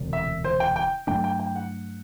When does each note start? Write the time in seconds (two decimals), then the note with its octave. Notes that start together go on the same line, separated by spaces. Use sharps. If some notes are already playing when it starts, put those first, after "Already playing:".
Already playing: E1 D2 C3 G3
0.13 E5
0.44 C5
0.60 G5
0.76 G5
1.07 G2 F#3 A3 D4 G5
1.24 G5
1.39 G5
1.55 F#5